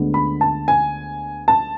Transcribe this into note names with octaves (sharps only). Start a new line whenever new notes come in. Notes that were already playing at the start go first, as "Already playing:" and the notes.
Already playing: D2 D3 G#3 B3
B5
A5
G#5
A5